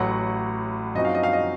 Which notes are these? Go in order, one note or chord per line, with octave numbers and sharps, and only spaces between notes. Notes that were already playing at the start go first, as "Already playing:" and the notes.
Already playing: A1 A2 F#3 F#5
F#2 F3 C4 D#4 F#4 D#5
F5
D#5
F5
D#5